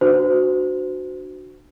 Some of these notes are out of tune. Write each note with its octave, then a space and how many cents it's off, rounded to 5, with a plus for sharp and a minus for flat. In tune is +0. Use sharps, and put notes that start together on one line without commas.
D4 +30 F#4 +0 C5 -35